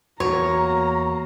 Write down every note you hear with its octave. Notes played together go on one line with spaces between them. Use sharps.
E2 A#3 F#4 C#5 A#5